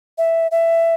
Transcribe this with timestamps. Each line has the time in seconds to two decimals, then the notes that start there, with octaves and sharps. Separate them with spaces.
0.18 E5
0.51 E5